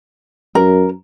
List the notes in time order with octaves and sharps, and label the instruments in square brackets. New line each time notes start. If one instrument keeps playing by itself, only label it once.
[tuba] F#2 [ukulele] A#4